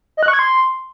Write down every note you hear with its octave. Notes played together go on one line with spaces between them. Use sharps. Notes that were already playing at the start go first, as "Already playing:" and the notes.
D#5
F#6
C#6
G#6
C6